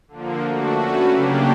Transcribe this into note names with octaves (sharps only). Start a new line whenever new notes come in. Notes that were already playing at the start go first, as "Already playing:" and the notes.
D3 F3 A#3
A3 D4 F#4
A3 C#4 F#4 B4
C#3 F#3 A#3 D4 G4